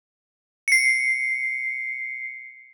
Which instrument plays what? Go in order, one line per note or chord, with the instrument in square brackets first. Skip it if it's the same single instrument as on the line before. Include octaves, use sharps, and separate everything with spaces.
[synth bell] C7 C#7